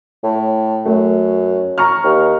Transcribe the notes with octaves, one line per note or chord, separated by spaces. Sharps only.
A2
F#2 A3
A#5 C#6 F6
D#2